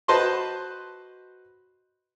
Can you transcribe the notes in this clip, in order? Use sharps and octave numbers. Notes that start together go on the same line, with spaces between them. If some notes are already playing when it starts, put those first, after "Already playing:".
F#4 B4 C5 D#5 A5 C6